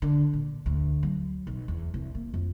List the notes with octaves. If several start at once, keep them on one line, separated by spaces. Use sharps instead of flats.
D3
A#2
D2
F#3
B1
E2
C2
A#3
F2